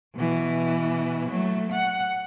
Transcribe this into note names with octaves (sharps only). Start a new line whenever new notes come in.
B2 E3
F#3 A3
F#5